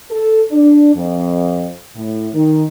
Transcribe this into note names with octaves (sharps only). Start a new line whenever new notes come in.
A4
D4
F2
A2
D#3